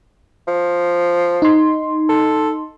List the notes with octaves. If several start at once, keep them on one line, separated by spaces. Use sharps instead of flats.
F3
D#4 C6
A4